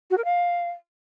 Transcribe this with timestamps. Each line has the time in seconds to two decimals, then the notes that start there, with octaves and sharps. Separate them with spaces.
0.10 F#4
0.18 A#4
0.25 F5